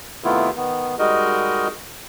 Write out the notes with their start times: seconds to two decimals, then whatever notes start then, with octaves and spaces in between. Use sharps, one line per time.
0.24 C3 D#3 A3 B3 E4 F4
0.56 D#3 B3
0.99 G3 G#3 D#4 F#4 A#4 D#5